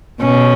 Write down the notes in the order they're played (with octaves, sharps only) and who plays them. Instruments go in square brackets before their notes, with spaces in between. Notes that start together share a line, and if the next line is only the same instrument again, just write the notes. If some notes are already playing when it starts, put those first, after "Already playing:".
[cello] B2 [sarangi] C#4